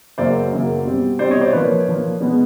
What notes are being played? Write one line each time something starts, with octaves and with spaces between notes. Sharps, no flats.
F#2 C#3 F#3 A#3 C5 D5
F#2 C#3 F#3 A#3
B2 G3 C4
B2 G3 C4 C5 D5
C#5 D#5
C5 D5
A#2 F3 A#3 B4 C#5
A#2 F3 A#3
B2 G#3 B3